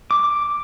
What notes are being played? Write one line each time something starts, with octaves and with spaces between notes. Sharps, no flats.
D6